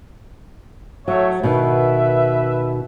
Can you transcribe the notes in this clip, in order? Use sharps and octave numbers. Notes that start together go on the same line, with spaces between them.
F#3 A3 C#5 E5
B2 D#3 B4 E5